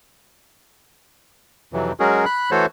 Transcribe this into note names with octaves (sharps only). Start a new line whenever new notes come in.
F2 C3 E3 F#3
F#3 G#3 C#4 F#4 G#4 A#4
B5 F#6
E3 A3 F#4 A4 C5 C#5